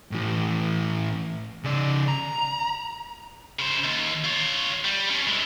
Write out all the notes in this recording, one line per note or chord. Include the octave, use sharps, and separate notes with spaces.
A2 E3
C#3 D5
A#5
C#3 C5
D#2
F4 C#5
G3
C#4 D4
G#3 E4